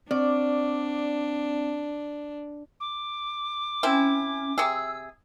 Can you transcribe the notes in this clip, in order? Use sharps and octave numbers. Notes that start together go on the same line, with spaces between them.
C4 D4 D5
D6
C4 C#4 E4
C3 G#4 E6